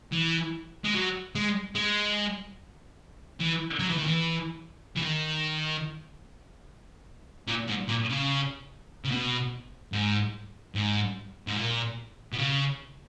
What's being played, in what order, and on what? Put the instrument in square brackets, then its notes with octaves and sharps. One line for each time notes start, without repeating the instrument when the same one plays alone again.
[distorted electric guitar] E3
G#3
F#3
G#3
G#3
E3
F#3
E3
D#3
E3
E3
D#3
A#2
G#2
A#2
C#3
C#3
B2
G#2
G#2
G#2
A#2
B2
C#3